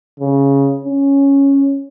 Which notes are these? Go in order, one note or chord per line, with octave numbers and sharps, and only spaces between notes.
C#3
C#4